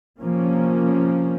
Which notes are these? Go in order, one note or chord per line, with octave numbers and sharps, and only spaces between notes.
C3 F3 A#3 C#4